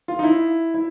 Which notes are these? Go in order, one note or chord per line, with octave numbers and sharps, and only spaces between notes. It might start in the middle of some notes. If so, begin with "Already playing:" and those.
F4
D#4
E4
E4